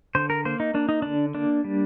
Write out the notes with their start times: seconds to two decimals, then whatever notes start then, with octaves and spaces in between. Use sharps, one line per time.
0.15 D3 C5
0.30 A#4
0.45 A#3 C5
0.60 D#4
0.74 A#3 D4
0.89 D#4
1.02 D3 D4
1.35 A#3 D4
1.65 G3